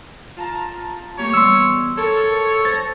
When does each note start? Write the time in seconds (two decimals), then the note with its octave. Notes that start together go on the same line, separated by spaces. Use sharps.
0.37 F4 A5 A#5
1.18 A3 A#3 G4 C#5
1.34 E3 G3 B3 C6 E6
1.97 A4 A#4 C#5
2.65 C5 A6 A#6